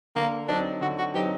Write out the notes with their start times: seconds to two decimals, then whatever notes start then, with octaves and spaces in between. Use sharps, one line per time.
0.16 D3 A#3
0.48 F#3 C4 D4 D#4
0.81 D3 F#4
0.98 F#4
1.14 F#3 C4 D#4 G4